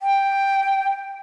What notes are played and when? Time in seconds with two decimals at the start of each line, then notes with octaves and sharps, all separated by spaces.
0.01 G5